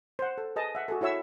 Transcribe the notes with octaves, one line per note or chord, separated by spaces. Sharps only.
C5 F#5
A4
G#4 B4 D#5 A5
E5 F#5
F#4 G#4 A4
E4 F#4 C#5 E5 E6